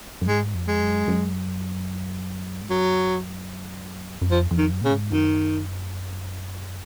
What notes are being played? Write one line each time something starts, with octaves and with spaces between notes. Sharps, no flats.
F#2
G#2 G#3
F2
G#3
F#2
F#2
G#2
F#2 F#3
F#2
F2 F3
F2
D#3
F#2
A#2 C#3
G#2
F#2 D#3